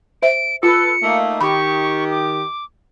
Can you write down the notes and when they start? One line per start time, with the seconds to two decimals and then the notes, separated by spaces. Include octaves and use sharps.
0.22 C5 E5 D7
0.63 F4 A4 B4 C#7
1.02 A3 A#3 D#4
1.41 D#3 G4 B5 C#6
2.11 D6